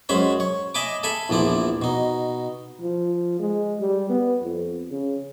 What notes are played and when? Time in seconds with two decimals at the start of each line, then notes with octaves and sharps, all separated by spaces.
0.09 F#2 G#3 C#4 C5 B5
0.40 C#5
0.75 D#5 E5 G#5 B5 D6
1.03 A4 E5 G#5 B5
1.29 A#1 E2 F3 E4 D5
1.82 B2 D#4
2.80 F3
3.39 G#3
3.80 G3
4.09 B3
4.42 F2
4.91 C#3